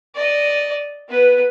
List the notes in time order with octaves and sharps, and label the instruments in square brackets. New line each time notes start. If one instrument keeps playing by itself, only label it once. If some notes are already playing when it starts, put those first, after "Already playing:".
[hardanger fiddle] D5 D#5
B3 B4